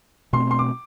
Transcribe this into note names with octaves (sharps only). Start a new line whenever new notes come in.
B2 A3 C4 C6
C6
D6